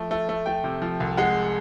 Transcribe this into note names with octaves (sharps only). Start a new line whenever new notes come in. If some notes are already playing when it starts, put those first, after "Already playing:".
Already playing: F3 A3
A3
A3
A3 G5
C3
F3
C2
G#3 F#5